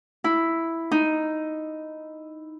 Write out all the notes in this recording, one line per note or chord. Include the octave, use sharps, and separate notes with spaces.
E4
D#4